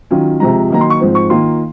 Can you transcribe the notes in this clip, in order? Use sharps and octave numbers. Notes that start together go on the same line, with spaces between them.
D#3 F#3 C#4 F4
C3 F3 G#3 A#5
D#3 F#3 A#3 D#4 A#5
C6
C#6
G#2 F3 C4
C#6
D#3 A#3 F4 C6